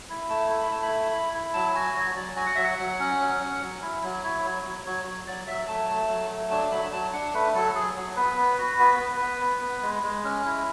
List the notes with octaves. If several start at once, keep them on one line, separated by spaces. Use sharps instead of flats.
E4
A3 A5
E4
B5
A3 A5
B5
E4
E4
E4
F#3 A5
F#4 G#5
F#3 C#5
F#3 D5
F#4 G#5
F#5
F#3 E5
F#5
F#3
C#4
F#3
C#4
F#3
E4
F#3
E4 C#5
F#3 C#5
F#3
F#3 C#5
F#3 C#5
F#3 D5
F#3 E5
A3 A5
A3
F#3
A3
D4 A5
F#3 B5
F#3 A5
D4 F#5
A3 B4
F#3 A4
F#3 G#4
F#3
B3 B4
B3
F#4
B3
B3
B3
B3
B3
G#3
G#3
C#4
E4